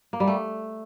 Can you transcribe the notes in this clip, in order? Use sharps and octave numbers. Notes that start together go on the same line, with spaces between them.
A#3
G3
A3